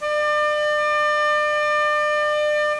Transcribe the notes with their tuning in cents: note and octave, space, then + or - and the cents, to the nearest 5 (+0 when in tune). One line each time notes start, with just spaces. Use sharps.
D5 +35